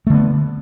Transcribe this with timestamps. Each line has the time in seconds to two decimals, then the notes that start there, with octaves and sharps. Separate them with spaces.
0.07 A3
0.10 D3
0.13 B3